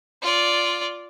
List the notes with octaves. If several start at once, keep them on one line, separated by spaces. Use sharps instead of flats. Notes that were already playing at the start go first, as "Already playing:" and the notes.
F4 D5